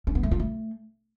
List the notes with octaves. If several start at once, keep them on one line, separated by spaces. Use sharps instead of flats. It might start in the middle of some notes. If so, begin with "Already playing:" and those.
C#4
B3
A3
F4
A3